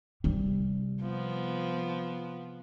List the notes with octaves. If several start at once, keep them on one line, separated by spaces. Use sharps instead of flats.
C3 G3
F3 B3